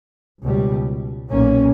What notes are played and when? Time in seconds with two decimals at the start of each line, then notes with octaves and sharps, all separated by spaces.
0.42 C#2 B2 G3
1.29 B1 A#2 A#3 C#4